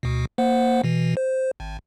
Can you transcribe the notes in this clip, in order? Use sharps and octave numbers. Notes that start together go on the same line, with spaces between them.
D2 B2
A#3 C5 F#5
B2 E3
C5
G#1